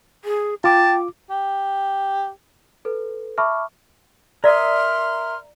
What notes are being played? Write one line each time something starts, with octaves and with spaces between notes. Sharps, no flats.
G#4
F4 G5 A5 D6
G4
A4 B4
E5 A5 B5 C#6 D6 F6
A#4 D5 E5 C6 D#6 F6